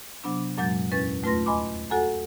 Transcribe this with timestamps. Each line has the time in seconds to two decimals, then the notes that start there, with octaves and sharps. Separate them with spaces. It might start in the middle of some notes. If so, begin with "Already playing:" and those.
0.23 C3 F#3 B3 D4 D6
0.58 F#2 A#2 F#3 G#3 G6 A6
0.92 E2 A#2 C#4 B4 A6
1.23 D#2 A3 F4 B4 C6 A#6
1.46 D#5 G#5 B5 C6 D6
1.90 F#4 A4 F#5 G#5 A#5